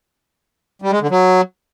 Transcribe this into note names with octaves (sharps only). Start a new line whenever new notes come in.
G3
G#3
D3
F#3